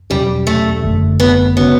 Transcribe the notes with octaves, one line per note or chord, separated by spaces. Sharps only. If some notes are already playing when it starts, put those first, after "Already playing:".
E2 B2 F#3 G3 C#4 G4
A3
G1 F#2 D3 A3
B3
C#3 G3 B3 C#4 F#4 C#5